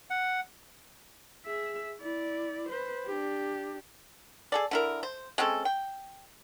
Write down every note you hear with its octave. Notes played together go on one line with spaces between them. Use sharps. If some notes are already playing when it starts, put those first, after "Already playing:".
F#5
G#4 E5
E4 D5
B4 C5
D4 G4
G#4 A4 D5
D3 E4 A#4
C5
G#3 C4 C#4 A4
G5